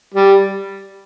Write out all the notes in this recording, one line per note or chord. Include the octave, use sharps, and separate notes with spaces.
G3